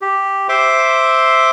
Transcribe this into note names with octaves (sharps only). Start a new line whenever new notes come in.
G4
C5 E5 C6 D6